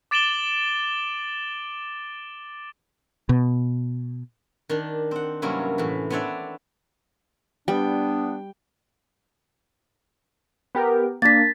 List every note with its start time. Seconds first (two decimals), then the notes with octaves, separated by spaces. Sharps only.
0.11 D6 A6 D7 E7 F#7 G7
3.29 B2
4.69 D#3 D4
5.11 C4 F#5
5.42 G2 C3 F#3 A#3 C#4 E4
5.78 A2 E3
6.10 B3 C4 D4 C#5 D5 E5
7.68 G3 B3 D4 G5
10.75 B3 G4 A#4
11.22 A#3 D4 A6 B6